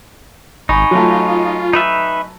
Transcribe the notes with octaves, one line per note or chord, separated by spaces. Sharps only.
G#1 D#4 G#5 B5 C#6
F#3 A3 F4
D#4 B4 E5